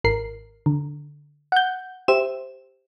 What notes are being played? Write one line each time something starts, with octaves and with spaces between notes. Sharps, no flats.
G#1 A#4 C7
D3
F#5 G6
G4 C5 E5 E7